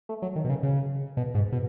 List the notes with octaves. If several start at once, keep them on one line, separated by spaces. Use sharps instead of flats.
A3
F#3
D#3
B2
C#3
C#3
B2
G#2
B2